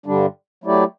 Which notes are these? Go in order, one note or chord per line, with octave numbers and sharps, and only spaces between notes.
G2 D3 G3 D4
F#3 A3 E4 G4 D5